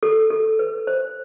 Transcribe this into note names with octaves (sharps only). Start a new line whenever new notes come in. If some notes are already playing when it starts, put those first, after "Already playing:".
A4
A4
B4
C5